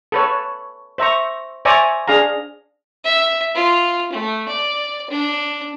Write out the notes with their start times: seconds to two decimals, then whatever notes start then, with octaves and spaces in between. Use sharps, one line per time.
0.12 A4 B4 C#5
0.98 C5 E5 A#5 C#6
1.65 C5 D5 E5 G#5 A#5 C#6
2.08 D4 G#4 F5 A#5
3.04 E5
3.55 F4
4.12 A3
4.48 D5
5.10 D4